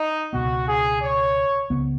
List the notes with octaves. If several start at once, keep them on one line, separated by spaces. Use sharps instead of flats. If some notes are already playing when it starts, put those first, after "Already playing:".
Already playing: D#4
C#2 B2 B3 F#4
G#4
C#5
C#2 C#3 B3